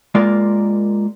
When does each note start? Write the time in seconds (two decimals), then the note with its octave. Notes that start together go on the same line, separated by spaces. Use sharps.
0.15 G#3 A#3 F4 A#4 D5